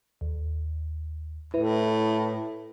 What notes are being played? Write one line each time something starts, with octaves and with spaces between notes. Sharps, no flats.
D#2
A2 E4 B4